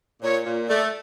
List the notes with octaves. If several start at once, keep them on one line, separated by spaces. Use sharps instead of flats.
A#2 C#5
A#2
A3 D5